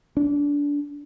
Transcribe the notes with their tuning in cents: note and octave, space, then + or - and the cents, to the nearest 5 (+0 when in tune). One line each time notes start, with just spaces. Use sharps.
D4 -25